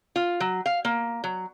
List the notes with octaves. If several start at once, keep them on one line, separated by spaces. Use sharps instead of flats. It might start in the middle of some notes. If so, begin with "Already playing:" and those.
F4
F#3
F5
A#3
F#3